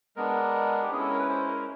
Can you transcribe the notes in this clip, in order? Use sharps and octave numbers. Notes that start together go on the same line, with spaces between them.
G#3 B3 D4 A#4
G4
G#3 C#4 E4 G#4
A4
A#4
B4
C5
A#4